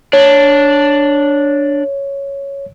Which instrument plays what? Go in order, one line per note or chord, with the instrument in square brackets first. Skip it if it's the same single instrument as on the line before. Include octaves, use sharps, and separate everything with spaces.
[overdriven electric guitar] D4 [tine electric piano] C#5